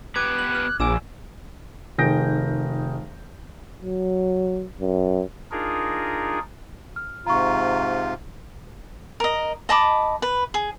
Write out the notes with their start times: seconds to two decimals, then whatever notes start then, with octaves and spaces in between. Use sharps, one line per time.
0.16 B3 G4 B4 D6 F#6 G#6
0.39 F#7
0.55 F6
0.80 A#1 G#5 D6 E6 E7
1.98 F1 D#3 G#4 G6 A#6 D7
3.82 F#3
4.81 F#2
5.51 D4 D#4 F4 G#4 A#4
6.96 F6
7.26 G#2 C3 F4 A#5 C#6
9.20 A#4 D#5
9.69 D#5 A5 B5 D6
10.22 B4
10.54 G#4